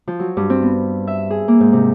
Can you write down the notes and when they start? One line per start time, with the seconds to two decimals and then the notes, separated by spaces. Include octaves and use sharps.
0.08 F3
0.20 F#3
0.37 G2
0.50 C4
0.63 B3
1.07 E5
1.30 G#4
1.48 A#3
1.60 G#2
1.73 C3